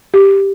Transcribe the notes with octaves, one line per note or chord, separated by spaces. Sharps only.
G4